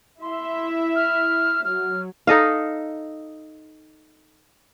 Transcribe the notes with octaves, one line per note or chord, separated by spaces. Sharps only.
E4 E5 C6
F6
F#3 F6
D#4 A4 D#5 F5